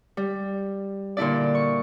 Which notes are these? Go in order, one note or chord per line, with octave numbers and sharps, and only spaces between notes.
G3
A#2 D3 E4 D5
C#6